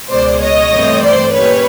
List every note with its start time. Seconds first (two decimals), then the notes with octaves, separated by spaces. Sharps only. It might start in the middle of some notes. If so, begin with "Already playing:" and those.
0.10 C#2 B2 G#3 C5 D5
0.41 C#5 D#5
0.71 G2 E3 A3 C4
1.02 C5 D5
1.33 A#2 G3 A#3 C#4 B4 C#5